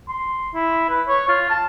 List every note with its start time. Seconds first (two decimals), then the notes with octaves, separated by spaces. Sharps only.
0.09 C6
0.54 E4
0.89 B4
1.08 C#5
1.28 F4
1.50 A5